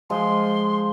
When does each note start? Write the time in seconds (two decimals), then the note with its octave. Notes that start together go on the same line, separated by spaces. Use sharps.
0.10 F3 G#3 C6